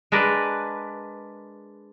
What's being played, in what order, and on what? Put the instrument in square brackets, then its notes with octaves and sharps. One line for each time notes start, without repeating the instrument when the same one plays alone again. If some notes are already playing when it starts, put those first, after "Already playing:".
[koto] G#3 D4 A#4 B4